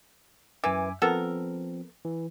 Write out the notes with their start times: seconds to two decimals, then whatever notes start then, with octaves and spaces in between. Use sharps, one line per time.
0.64 F#2 E3 G#5 D6
1.02 F3 B3 C4 A4 A#4
2.05 E3